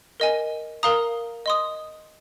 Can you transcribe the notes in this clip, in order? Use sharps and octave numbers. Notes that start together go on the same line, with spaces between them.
A#4 D#5 G#5
A#4 F5 A#5 D#6
D#5 C6 D#6